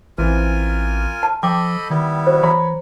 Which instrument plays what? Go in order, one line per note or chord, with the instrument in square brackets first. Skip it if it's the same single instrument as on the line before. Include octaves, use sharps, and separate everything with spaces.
[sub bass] A1 [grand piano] E3 C4 [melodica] F4 A#4 G#5
[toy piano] A5
[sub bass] F3 [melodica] A4 D#5 B5 [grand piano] G5 [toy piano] D6
[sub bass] D#3 [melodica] G3 B3 E4
[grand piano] F#4 [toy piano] C5
[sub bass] E3 [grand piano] C#5 A#5 B5